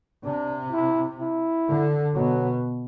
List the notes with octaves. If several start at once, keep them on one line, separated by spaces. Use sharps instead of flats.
C3 D4
E4
E4
D3
B2 F#3